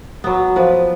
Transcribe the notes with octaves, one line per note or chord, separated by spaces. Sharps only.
F#3 B3
F3 B4